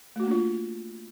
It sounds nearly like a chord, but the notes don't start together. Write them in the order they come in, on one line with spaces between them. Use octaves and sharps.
A3 F#4 A#3 D4 F4